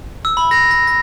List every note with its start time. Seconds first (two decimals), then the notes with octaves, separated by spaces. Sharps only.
0.25 E6
0.37 B5
0.51 A#6
0.71 A#6
0.87 A#6